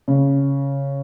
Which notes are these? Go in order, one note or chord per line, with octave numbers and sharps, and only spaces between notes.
C#3